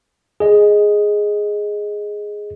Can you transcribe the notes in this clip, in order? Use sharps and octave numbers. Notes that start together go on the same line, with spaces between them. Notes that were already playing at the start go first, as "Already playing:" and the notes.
G#4 D#5